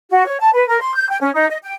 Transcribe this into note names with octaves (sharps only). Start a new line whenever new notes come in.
F#4
C#5
A5
B4
A#4
C6
G6
G5
C#4
D#4
D#5
G5